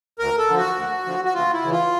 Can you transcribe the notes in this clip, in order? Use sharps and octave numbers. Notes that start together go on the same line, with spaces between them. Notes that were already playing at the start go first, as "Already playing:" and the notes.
D2 A#4
A4
D3 F3
F#4
D2
D3 F3
F#4
D2 F4
E4
C#3 E3
F4